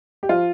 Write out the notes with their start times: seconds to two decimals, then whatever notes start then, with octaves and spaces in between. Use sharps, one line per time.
0.23 G4
0.29 F3 F4